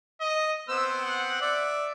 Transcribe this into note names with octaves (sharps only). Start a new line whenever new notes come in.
D#5
B3 C4 C5 E6
F#5
D5 E5